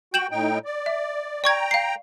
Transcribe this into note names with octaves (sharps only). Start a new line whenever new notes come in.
F#4 G5 G6 E7 F#7
A2 D#4 G5
D5
E5
D5 G5 A#5 C#6 G#6
F5 C7